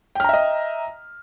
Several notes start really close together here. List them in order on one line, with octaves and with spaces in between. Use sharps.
G5 F6 A#5 E5 D#5